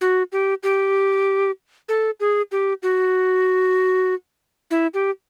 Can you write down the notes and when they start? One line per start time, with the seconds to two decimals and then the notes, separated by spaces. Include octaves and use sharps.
0.01 F#4
0.32 G4
0.63 G4
1.89 A4
2.20 G#4
2.52 G4
2.83 F#4
4.71 E4
4.94 G4